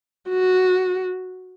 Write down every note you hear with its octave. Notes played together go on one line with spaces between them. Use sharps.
F#4